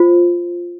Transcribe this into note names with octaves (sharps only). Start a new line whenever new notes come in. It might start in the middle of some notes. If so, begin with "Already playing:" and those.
Already playing: F4 C5